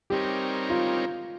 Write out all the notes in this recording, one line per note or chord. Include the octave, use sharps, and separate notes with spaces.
G3 C4 D#4 G4 A#4 C#5
F4